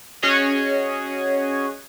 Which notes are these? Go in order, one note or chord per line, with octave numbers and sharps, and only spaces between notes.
C#4 F#4 G#4 C#5 D#5